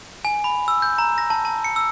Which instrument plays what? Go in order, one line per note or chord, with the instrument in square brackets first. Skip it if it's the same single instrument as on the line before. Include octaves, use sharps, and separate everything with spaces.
[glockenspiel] G#5
B5
E6
G6
A#5
A#6
A5
A5
C#7
E6